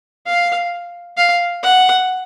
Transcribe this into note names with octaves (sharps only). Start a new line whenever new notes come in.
F5
F5
F#5